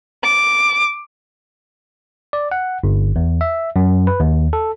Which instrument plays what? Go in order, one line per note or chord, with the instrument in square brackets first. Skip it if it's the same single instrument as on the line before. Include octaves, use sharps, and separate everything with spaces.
[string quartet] D6
[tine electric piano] D5
F#5
G1
E2
E5
F#2
B4
D#2
A4